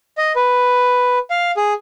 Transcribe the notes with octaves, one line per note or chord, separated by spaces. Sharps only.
D#5
B4
F5
G#4